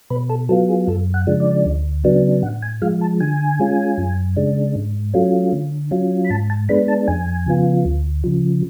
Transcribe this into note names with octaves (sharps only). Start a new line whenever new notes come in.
B2 B4
A4
F#3 B3 F4 A4
G#4
F#2 A4
F#5
C#3 F3 G#3 D4
D5
D2
C#3 F#3 B3 D4
A2 F#5
G#5
F3 G#3 F5
A5
D3 G#5
G#3 C#4 F4
F#2
C#3 G#3 D4
G#2
F#3 A3 C#4 F4
D3
F#3 C#4 F4
B5
G#2 A5
A5
G#3 B3 D4 B5
A5
F2 G#5
C#3 F3 B3 F4
D2
C#3 F3